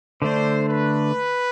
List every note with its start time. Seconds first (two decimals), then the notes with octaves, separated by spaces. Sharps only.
0.22 D3 A3 D4 C5
0.68 B4